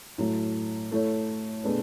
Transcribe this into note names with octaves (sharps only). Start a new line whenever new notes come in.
A2 F#3 A3
A3 E4 A4 C#5
B2 A3 D4 G#4 B4